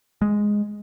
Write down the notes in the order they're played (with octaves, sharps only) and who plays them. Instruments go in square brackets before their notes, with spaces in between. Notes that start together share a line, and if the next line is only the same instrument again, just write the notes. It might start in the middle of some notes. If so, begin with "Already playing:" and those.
[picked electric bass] G#3